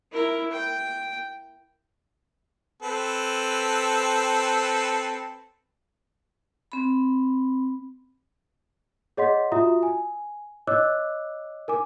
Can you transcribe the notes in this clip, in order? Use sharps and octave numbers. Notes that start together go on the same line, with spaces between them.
E4 A#4
G5
C4 A4 B4
C4 B5
G#4 C#5 D#5 F#5 C6 B6
F4 F#4 E5 A#5 D#6
G#5
C#5 D#5 D6 E6 F#6
A#4 G#5 D6